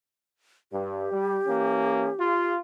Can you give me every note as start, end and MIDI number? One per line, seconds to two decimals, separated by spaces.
0.72 1.07 43
0.72 2.53 67
1.11 1.38 55
1.47 2.09 52
1.47 2.09 58
1.47 2.09 61
2.18 2.57 65